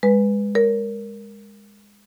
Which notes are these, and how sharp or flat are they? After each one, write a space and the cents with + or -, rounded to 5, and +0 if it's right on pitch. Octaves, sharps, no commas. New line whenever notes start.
G#3 -20 B4 +0
A#4 +0 C#5 +20